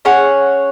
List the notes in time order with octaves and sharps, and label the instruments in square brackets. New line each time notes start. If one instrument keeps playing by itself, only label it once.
[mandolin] C#4 G#4 C#5 F#5